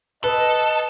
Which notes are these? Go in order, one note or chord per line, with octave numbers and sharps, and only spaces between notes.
A4 B4 D#5